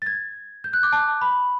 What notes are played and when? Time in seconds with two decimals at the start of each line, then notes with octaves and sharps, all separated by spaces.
0.02 A6
0.06 G#6
0.64 G6
0.73 F#6
0.83 D6
0.93 A5
1.21 B5